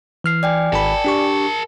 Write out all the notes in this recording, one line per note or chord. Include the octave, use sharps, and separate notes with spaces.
E3 F6 C7
D5 G5 G#5
G#1 A#4 A5 B5
D4 G4 C#6